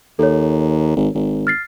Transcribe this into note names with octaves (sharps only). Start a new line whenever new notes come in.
D#2 A4 C#5
G#1
G#1
F6 A6 C7